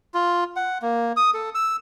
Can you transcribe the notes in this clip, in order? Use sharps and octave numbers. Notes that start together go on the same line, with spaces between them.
F4
F#5
A#3
D#6
A4
E6